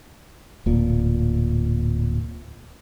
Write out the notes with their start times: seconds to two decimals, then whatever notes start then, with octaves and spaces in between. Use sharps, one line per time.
0.66 D1 A#2